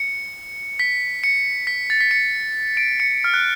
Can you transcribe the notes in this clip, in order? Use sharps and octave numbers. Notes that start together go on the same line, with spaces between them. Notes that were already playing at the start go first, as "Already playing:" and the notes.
Already playing: C#7
B6
C#7
B6
A6
B6
C#7
D7
C#7
F6
F#6